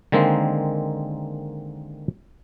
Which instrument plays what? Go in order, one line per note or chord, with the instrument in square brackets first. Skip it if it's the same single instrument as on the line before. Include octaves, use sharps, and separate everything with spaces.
[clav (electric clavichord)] D3 D#3 G#3 A#3 C4